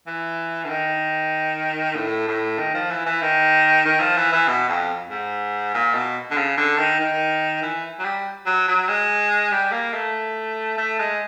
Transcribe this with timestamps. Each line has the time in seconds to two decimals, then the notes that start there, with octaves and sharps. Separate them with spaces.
0.07 E3
0.64 D3
0.69 D#3
1.96 A2
2.28 A2
2.59 D#3
2.74 F3
2.90 E3
3.06 E3
3.22 D#3
3.85 D#3
4.00 F3
4.17 E3
4.32 E3
4.48 B2
4.69 F2
5.11 G#2
5.74 A#2
5.94 B2
6.31 D3
6.37 C#3
6.57 D3
6.78 D#3
7.00 D#3
7.62 E3
7.99 F#3
8.05 G3
8.46 F#3
8.68 F#3
8.89 G#3
9.52 G3
9.72 A#3
9.94 A3
10.78 A3
10.99 G#3